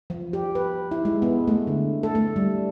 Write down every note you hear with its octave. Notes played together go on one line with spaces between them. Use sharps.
F3
G4
B4
E4
G#3
B3
A3
D3
A4
A3
G3